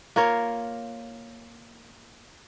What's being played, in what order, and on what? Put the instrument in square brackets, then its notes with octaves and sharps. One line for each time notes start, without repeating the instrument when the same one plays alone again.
[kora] A#3 F4 A#4 C#5